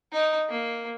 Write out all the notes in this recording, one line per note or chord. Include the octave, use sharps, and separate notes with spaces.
D#4
A#3